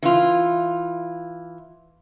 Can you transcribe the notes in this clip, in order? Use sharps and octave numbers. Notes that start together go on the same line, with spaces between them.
E3 F4